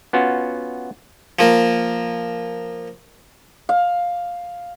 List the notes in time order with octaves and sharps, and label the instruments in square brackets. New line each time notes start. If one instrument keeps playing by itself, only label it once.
[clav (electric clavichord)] B3 C#4 F4 F#4
[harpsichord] F3 A#3
[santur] F5